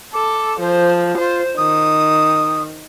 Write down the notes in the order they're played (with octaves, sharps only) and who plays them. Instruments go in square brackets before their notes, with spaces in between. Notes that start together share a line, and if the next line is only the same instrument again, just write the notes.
[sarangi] A4 [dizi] D6
[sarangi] F3 [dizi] C5
[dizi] F4 [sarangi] C5
[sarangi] D#3 [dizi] D#6